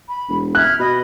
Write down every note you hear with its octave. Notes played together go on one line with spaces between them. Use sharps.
B5
E1
E5 F6 F#6 G#6
B2 D#5 B5